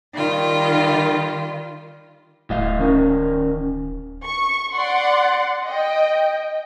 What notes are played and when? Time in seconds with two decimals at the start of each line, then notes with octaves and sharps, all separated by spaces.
0.13 D#3 G3 F4
2.50 D1 A2 D#5 F5
2.79 D#3 C#4 A#4
4.24 C#6
4.76 D5 F#5 C6
5.63 D#5 G5